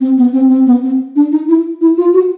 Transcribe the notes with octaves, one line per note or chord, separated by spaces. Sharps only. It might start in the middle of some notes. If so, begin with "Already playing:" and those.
C4
B3
C4
C4
B3
C4
D4
D#4
E4
E4
F4
F#4